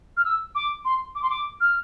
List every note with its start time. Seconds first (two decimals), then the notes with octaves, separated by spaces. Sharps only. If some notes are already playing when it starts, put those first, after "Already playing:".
0.17 F6
0.25 E6
0.55 D6
0.85 C6
1.15 D6
1.23 C6
1.30 D6
1.61 F6